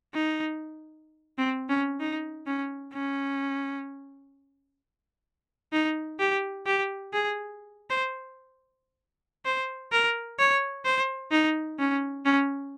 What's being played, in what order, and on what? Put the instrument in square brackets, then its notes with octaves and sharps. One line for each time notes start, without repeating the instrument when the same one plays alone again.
[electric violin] D#4
C4
C#4
D#4
C#4
C#4
D#4
G4
G4
G#4
C5
C5
A#4
C#5
C5
D#4
C#4
C#4